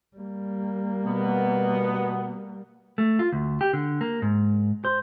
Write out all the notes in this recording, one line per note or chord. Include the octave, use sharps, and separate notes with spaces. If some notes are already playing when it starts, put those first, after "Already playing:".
G3 A#3
B2 B3
A3
F4
D2
G4
D3
A#3
G#2
C5